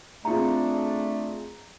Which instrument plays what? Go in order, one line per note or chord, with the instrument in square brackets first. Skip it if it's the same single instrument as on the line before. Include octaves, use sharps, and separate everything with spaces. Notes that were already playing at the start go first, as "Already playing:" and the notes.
[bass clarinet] A3 [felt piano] C4 F4 G#4 [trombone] D4 [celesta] A#5